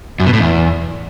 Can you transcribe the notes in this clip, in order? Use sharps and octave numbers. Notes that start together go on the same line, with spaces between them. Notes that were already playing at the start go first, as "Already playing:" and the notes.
F#2
B2
A2
E2